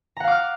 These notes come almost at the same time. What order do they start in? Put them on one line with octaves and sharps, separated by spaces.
A#5 F#5 F5 D6 F6